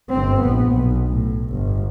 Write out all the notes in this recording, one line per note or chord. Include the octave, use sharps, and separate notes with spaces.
G1 C4
A#1 B3
B1
A2
G1